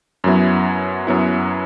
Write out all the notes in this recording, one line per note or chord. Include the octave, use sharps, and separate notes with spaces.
F#2 F#3 B3 E4
F#2 F#3 B3 E4